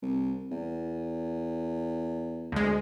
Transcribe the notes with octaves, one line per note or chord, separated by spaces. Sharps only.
C2
E2
D2 G#3